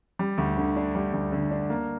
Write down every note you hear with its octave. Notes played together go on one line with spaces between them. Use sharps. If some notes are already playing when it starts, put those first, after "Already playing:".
G3
D2
D3
D4
G3
D2
D3
D4
A#3